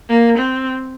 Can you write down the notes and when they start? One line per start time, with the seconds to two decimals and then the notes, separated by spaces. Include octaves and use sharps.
0.09 A#3
0.37 C4